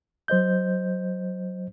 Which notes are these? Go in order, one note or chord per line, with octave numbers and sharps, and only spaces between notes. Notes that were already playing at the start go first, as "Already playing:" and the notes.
F#3 C5 D#5 G6